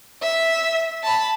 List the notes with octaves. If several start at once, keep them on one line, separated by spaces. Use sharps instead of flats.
E5
A5 B5